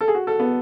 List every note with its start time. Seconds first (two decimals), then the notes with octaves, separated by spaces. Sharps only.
0.01 A4
0.08 G#4
0.15 F#4
0.27 A4
0.40 B3